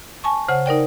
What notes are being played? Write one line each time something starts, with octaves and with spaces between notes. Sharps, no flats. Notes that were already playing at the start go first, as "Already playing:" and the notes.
G#5 A5 C#6
C#3 C5 F#5
D#4 A#4 D5 G5